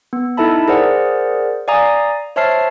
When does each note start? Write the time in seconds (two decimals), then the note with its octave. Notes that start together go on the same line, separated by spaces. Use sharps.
0.13 B3
0.37 D#4 E4 A4 E5 A5 B5
0.68 G#4 A#4 C5 D5 F#5
1.68 D5 F5 G#5 A#5 D#6
2.36 C5 C#5 E5 A5 F6 C7